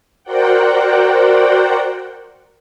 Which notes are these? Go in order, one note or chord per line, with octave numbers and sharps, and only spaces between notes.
F#4 A#4 C5 D5 F#5 G5